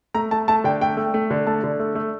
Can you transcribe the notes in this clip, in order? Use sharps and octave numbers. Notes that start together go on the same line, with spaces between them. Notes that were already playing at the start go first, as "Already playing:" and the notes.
A3 A#5
A3 A5
A3 A5
D3 G5
A3 G5
A3
A3
D3
A3 A5
D3
A3
A3